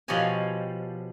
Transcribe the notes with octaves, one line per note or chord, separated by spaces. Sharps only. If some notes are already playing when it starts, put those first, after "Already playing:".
B2 F3 G4 C#5 D#5 G#5